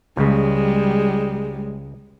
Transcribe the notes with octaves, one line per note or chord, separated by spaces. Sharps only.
C#2 C#3 G3 G#3